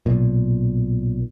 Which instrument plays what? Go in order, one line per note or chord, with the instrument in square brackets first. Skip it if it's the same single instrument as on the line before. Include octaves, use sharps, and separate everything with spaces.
[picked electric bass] B1 A#2